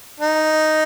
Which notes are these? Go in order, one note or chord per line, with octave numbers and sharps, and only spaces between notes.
D#4